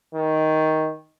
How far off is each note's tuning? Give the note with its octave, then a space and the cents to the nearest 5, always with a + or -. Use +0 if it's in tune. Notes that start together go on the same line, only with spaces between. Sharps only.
D#3 +10